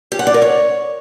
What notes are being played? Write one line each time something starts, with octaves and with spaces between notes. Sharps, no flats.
G4
F#5
D5
A#4
C#5